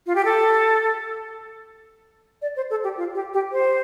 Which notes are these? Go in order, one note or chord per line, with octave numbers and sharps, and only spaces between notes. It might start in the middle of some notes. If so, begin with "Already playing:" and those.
F4
G4
A4
D5
C5
A4
G4
F4
G4
G4
C5